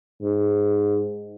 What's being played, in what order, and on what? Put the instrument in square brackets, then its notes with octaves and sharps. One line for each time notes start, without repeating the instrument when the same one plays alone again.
[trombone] G#2